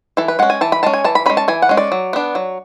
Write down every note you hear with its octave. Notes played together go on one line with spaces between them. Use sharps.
E3 A4
B4
G#3 C#4 F#5
G#5
E3 A5
B5
G#3 C#4 A5
G#5
E3 A5
B5
G#3 C#4 B5
A5
E3 G#5
F#5
G#3 C#4
D5
F#3
B3 D4
F#3